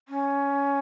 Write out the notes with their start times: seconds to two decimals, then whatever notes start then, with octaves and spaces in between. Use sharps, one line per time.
0.08 C#4